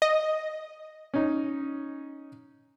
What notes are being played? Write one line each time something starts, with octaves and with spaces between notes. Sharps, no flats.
D#5
C#4 D#4